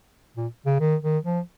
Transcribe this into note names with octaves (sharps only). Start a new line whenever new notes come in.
A#2
C#3
D#3
D#3
F3